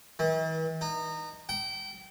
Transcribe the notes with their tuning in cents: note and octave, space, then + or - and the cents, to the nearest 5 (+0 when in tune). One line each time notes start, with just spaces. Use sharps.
E3 -45
D#4 -25
G5 -30